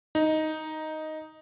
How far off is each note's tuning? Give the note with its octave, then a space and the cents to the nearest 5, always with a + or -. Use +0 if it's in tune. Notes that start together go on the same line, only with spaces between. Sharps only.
D#4 +5